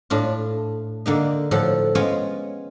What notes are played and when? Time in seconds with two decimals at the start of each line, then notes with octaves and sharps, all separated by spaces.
0.10 A2 D4 F4
1.06 D3 A#3 D#4
1.51 A2 F3 F#4 A4
1.95 G#3 B3 C#4 F4 G#4 C#5